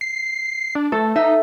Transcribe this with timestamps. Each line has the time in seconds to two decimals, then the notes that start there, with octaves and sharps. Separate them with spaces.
0.01 C7
0.75 D4
0.92 A3 A4
1.16 D#4 E5